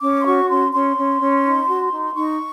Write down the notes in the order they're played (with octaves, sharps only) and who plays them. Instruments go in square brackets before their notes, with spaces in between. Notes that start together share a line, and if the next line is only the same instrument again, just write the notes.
[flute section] C#4 D6
C6
F#4 C#6
C#4 C6
C#4 C6
C#4
C#4
D#4
F#4
D#4
D#4 C#6